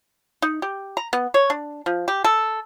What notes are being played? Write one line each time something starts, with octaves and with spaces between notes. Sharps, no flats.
D#4
G4
A#5
B3
C#5
D4
F3
G4
A4